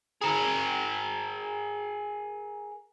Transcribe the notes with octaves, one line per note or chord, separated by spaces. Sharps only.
G#4 A#4